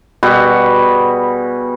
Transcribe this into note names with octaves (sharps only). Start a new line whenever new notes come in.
B2 G3 F#4 G#4